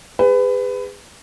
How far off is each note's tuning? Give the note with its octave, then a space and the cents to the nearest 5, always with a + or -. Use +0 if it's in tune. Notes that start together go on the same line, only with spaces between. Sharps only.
G#4 -30 B4 +25